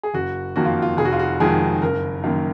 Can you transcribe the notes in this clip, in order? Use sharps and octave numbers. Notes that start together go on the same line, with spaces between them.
G#4
F#1 F#4
F2 D#3 A#3 F#4
F4
F4
F1 G#4
F#4
F4
F#4
F2 D#3 G#3 G#4
F#1 A#4
F#2 D#3 A#3